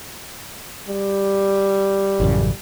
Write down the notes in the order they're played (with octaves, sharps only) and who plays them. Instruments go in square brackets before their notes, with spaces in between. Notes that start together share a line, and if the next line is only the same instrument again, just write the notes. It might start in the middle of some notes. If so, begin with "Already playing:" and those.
[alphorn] G3
[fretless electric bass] A1 F#2 C#3